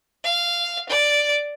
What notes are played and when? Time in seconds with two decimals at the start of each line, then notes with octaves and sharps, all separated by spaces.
0.24 F5
0.89 D5